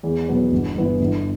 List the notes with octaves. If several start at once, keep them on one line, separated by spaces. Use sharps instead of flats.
E2
B2 F#3 B3
G1
G2 E3 B3 E4
G1